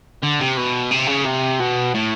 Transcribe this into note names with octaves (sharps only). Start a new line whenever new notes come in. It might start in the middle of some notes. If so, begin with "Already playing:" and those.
D3
C3
B2
C3
C#3
C3
B2
A2